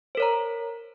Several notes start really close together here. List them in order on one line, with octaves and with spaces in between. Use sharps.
C5 A#4 C#5 A#5